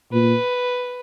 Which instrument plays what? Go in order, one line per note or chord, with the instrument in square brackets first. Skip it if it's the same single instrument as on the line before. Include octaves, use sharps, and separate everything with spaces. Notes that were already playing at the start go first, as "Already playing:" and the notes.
[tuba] A#2 [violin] B4